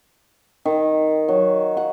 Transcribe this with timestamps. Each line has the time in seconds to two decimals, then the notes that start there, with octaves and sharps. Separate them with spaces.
0.65 D#3
1.28 F#3
1.77 F#5